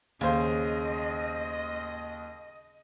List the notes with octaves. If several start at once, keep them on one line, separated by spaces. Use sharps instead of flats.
D#2 C#3 C5 D#5